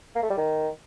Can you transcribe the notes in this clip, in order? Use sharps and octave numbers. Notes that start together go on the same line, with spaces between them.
A#3
A3
G3
D#3